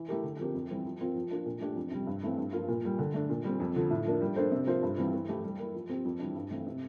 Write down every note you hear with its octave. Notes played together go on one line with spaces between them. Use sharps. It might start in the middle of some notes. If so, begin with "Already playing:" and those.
Already playing: E3
A3 E4 G4 A#4
D3
F3 C4 G4 A#4
F2
E3 G3 C4
F3
C4 F4 A#4
F3
A#3 D4 F4
A#2
A3 D4 G4
F2
C3 G3
G2
E3 A3 C4
G2
F3 A#3 F4
A#2
G3 A#3
D3
A3 D4
A#2
G3 C4
F2
D3 F3
A2
F3 A#3 D4
G3
A#3 D4 A4 C5
C3
F3 A#3 F4 C5
G2
E3 G3 C4
E3
A3 E4 G4
G3
A#3 E4
F3
C4 G4
F2
E3 G3 D4
G2
E3 A3 C4
C3